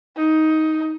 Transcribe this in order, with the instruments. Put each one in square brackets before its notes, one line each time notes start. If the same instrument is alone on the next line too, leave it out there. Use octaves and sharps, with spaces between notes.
[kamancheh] D#4